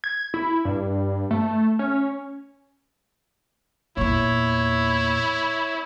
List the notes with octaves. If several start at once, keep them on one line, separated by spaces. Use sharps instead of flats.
G#6
E4
G2
A3
C#4
E2 A#2 E4 C#5